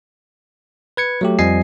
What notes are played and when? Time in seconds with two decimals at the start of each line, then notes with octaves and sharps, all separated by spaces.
0.97 B4 G#6 C#7
1.21 F#3 A3 G4
1.39 F2 F3 G3 D#5 G#5 C7